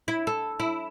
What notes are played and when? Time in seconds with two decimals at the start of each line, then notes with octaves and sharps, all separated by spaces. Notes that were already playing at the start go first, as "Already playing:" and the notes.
0.08 E4
0.27 A4
0.60 E4